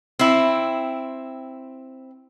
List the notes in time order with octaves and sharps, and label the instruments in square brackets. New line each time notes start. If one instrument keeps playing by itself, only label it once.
[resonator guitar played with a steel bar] C4 E4